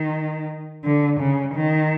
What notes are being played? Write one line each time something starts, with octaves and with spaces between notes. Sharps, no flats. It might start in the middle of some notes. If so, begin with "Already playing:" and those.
Already playing: D#3
D3
C#3
D#3